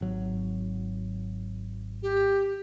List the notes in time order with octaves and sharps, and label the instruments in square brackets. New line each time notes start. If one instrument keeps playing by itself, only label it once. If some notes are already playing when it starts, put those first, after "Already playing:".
[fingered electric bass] G#1 F#3
[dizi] G4